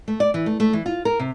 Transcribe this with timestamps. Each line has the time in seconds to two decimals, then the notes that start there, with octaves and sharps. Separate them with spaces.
0.08 A3
0.20 D5
0.34 E3
0.46 A3
0.60 A3
0.73 E3
0.86 F4
1.05 A#4
1.19 C3